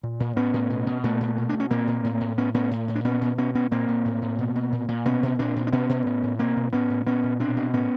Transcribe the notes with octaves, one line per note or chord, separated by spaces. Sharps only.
A#2
A#2
A2 B3 C#4
A2
B2
B2
A#2 A3 B3
A#2
B2
B2 D4
C#4
A#2 A#3 C4
A#2
A2
A2
A2 B3 C#4
A2 B3 C#4
A2
A2
D4
A#2 B3 C#4
A#2
B2 B3 C#4
B2 B3 C#4
A#2 A#3 C4
A#2
A2
A2
B2
B2
A#2
A#2
B2 B3 C#4
B2
A#2 C4 D4
A#2
D4
B2 B3 C#4
B2
A2
A2
B2 A#3 C4
B2
A2 B3 C#4
A2
A#2 B3 C#4
A#2
B2 C4 D4
B2
A2 B3 C#4